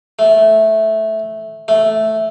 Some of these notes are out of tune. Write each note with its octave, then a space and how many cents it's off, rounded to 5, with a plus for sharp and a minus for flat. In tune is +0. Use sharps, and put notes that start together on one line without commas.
A3 -10
A3 -5